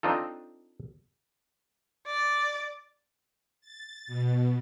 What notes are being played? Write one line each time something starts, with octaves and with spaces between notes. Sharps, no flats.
C4 D4 D#4 F4 A4
D5
A6
B2